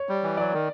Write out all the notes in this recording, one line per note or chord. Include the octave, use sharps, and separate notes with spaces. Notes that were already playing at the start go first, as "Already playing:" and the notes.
Already playing: C#5
G3
E3
F#3 D5
D#3